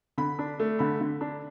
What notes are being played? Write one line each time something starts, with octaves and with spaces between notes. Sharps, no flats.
D3 B5
D4
A3
D3 B5
D3
D4